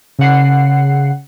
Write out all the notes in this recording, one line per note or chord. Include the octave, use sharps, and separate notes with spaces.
C#3 F#5 C7